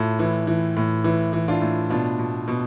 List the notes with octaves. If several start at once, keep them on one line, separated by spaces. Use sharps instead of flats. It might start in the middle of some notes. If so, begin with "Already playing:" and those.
Already playing: A2 F4 A4
E3
E3
A2
E3
E3
D4 F4
A2
B2 D4 F4
B2
B2